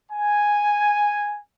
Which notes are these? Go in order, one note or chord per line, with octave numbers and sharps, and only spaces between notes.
G#5